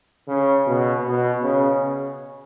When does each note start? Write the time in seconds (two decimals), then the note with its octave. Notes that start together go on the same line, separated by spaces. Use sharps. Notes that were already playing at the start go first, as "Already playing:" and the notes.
0.28 C#3
0.67 B2
1.05 B2
1.42 C#3